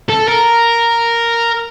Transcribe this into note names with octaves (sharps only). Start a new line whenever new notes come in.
A4
A#4